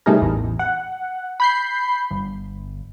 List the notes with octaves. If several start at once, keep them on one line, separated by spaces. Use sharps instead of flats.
C3 G3 A3 D#4 G#4 A#4
A1 E2
F#5
B5 G6 C7
G1